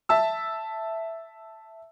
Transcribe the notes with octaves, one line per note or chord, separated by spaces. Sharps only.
E5 A5 E6